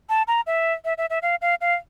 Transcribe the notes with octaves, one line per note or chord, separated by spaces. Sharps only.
A5
A#5
E5
E5
E5
E5
F5
F5
F5